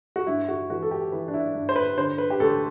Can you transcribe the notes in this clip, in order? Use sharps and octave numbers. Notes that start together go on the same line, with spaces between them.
F#4
G2 E4
F#4
E3 F#4
A4
G4
E3 B4
D4
E4
G2
C5
B4
D3 C5
B4
G4
D2 A4